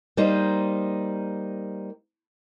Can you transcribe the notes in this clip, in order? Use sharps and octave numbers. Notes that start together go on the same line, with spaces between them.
G3 A#3 D#4 C5